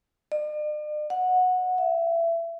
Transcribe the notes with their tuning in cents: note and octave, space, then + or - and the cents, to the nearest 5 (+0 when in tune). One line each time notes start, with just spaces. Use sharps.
D5 +45
F#5 -15
E5 +25